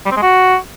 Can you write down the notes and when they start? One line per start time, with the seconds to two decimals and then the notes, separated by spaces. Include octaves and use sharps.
0.06 G3
0.11 C4
0.17 G#3
0.22 F#4